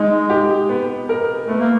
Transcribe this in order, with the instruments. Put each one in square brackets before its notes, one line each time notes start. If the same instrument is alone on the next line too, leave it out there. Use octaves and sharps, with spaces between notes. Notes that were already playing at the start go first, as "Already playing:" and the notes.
Already playing: [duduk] G#3 [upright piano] D#4
[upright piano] G4
B3
A#4
[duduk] A3 [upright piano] B3
[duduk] A#3